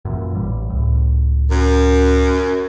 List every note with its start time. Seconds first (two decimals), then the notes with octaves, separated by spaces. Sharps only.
0.05 F#2 A#2 E3
0.34 A1 G3
0.70 C#2 A2
1.51 F#2